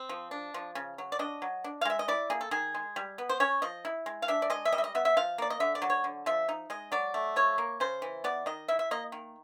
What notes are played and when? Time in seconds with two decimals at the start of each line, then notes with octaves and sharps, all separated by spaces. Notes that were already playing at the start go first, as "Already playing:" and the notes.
Already playing: C4
0.09 F3
0.31 D4
0.54 F3
0.75 C#3
0.98 F#3
1.12 D5
1.19 D4 D#5
1.42 F#3
1.64 D4
1.81 F5
1.85 G#3 E5
1.99 D#5
2.08 E4 D5
2.30 A#3 G#4
2.41 A4
2.51 D#3 G#4
2.74 G#3
2.96 G3
3.18 B3
3.29 C5
3.40 C#4 C#5
3.62 F3 D#5
3.85 E4
4.06 G#3
4.22 F5
4.28 D4 E5
4.42 D5
4.50 G#3 D#5
4.65 E5
4.72 G3 D#5
4.78 E5
4.84 D#5
4.95 B3 E5
5.05 E5
5.17 F3 F5
5.38 A#3 D5
5.50 D#5
5.60 D3 E5
5.75 D5
5.82 F#3
5.90 C#5
6.04 D3
6.26 F3 E5
6.49 D#4
6.70 G#3 D#5
6.92 F#3 D5
7.14 A3
7.36 F3 C#5
7.58 A#3
7.80 C#3 C5
8.02 E3
8.24 B3 D5
8.46 D#3 D#5
8.68 E4 E5
8.79 E5
8.91 A#3 D#5
9.12 D#3